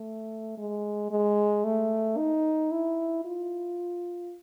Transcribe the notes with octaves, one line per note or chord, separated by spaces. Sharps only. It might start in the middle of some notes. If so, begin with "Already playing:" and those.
Already playing: A3
G#3
G#3
A3
D#4
E4
F4